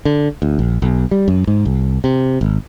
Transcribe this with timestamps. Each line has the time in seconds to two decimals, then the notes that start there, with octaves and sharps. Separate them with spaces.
0.05 D3
0.42 D2
0.59 A#1
0.82 B1
1.11 G3
1.28 F#2
1.47 G#2
1.65 C2
2.04 C3
2.41 G#1